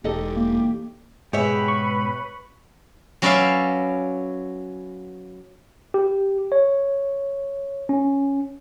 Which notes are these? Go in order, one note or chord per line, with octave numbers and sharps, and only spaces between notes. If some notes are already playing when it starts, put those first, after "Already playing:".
E1 D#4 G4 A4 D#5
A#3
G#2 B2 G4 G#4 B4 C#5 E5 B5
C#6
F#3 C#4 B4 D5 E5 F5
G4
C#5
C#4